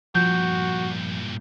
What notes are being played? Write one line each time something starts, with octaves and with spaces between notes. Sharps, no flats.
G2 A#2 F3 F#4 G6